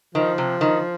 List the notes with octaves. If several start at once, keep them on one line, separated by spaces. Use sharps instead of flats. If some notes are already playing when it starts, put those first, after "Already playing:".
D#3 F3
C3
D#3